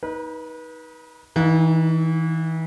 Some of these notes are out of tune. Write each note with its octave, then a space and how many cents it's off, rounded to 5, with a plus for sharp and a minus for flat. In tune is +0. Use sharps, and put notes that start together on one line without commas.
D#4 +25 B4 -30
E3 -30 D#4 +0 F5 +30